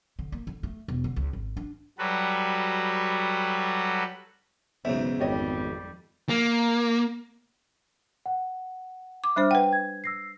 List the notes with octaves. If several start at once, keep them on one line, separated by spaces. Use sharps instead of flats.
D3
A#3
D3
A3
E1
D3
C#2
G#1
D4
F#3 G3 F#4 A4 B4
B1 E2 G#2 C#3 E5
G#1 F2 G3 G4 C#5 D#5
A#3
F#5
D6
G3 D4 C5 E5 D6 F6
B4 F#5 G5
G#6
E6 A#6 C7